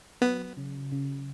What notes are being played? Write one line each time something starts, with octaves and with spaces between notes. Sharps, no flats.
F#3 B3
C#3
C#3